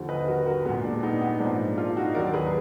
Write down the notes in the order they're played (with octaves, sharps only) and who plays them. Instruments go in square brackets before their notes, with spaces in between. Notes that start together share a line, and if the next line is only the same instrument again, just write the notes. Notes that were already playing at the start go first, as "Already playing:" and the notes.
Already playing: [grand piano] D#2 D3 F3
B4 D#5
F#4 A#4
F#4 A#4
G#3 B3
A#2
D4
B3 D#4
B3
G#2 F3 A#3 D4
D4 F4
D#4 F#4
D#2 D#3 F#3 A#4 D5
G#4 B4